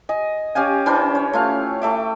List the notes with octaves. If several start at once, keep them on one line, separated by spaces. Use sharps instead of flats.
D#5 G#5
C#4 G4 F5 G#5
E3 C#4 D4 C5
C#5
A3 F4 F5
A3 E5 D6